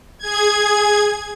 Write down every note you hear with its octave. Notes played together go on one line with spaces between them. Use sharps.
G#4 G#6